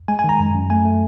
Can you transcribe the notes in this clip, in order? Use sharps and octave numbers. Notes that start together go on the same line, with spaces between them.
G#3 G#5
G#5
D#3 A#5
F#2
F#2
A3 G#5
A3